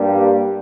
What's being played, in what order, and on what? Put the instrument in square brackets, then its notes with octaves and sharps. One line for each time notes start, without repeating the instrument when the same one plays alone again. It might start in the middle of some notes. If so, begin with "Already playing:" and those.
Already playing: [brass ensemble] G2 G3 A#3